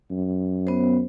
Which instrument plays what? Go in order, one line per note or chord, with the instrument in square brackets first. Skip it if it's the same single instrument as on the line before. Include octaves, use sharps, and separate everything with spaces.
[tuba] F#2
[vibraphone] B3 C5